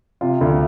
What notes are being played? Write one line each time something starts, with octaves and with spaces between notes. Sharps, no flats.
C3 F4
D2